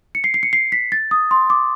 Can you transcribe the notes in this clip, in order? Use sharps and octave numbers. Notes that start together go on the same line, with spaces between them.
C#7
C7
C7
C#7
C7
B6
A6
D#6
C6
D6